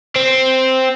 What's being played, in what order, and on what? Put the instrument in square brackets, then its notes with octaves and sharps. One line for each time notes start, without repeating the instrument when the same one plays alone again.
[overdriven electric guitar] C4